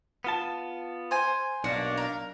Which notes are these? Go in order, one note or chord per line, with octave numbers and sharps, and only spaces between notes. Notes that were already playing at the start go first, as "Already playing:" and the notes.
B3 F4 A5
C5 G#5
B1 A#3 D4 F#4
A#4